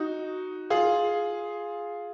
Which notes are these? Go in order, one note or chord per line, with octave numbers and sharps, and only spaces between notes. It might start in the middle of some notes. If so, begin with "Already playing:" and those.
Already playing: D#4 F#4
F4 G#4